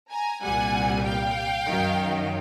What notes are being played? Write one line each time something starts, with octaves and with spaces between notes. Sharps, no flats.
G#5 A#5
C2 A#2 G3 F#5 G#5
F5 G5
F#2 D#3 F#3